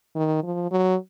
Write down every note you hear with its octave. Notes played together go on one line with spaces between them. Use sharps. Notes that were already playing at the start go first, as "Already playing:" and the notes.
D#3
F3
F#3